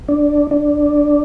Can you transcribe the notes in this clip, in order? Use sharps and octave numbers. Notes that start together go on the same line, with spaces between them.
D4
D4